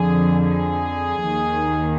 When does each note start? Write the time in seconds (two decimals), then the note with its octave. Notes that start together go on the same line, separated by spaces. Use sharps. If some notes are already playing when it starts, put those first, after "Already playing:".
Already playing: F2 D3 F3 G#4
0.38 G#4
1.27 D#2 D#3